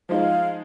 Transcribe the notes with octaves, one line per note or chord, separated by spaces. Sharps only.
F3 G#3 D#4 F5